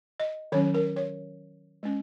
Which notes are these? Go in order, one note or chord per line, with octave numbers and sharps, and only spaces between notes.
D#5
D#3 F#3 C#4 C#5
A#4
C#5
G#3 C#4